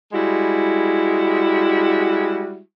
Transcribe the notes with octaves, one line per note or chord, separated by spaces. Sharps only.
G3 G#3 E4 F#4